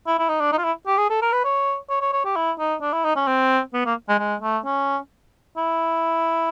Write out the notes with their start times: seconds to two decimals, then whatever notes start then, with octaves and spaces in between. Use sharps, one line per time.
0.07 E4
0.19 E4
0.29 D#4
0.40 D4
0.52 D#4
0.58 F4
0.64 E4
0.87 G4
0.98 G#4
1.10 A4
1.22 A#4
1.32 B4
1.44 C#5
1.90 C#5
2.01 C#5
2.13 C#5
2.25 G4
2.36 E4
2.59 D#4
2.81 D4
2.93 E4
3.04 D#4
3.16 C#4
3.27 C4
3.73 B3
3.86 A#3
4.09 G#3
4.19 G#3
4.42 A3
4.65 C#4
5.57 E4